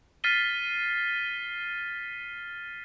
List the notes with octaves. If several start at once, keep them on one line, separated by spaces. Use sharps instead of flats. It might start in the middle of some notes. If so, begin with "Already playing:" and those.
F6 A6 B6 C7 D#7 G7